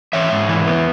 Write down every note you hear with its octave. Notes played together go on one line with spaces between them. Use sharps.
E3 C#5 E5
G#2
E3
B3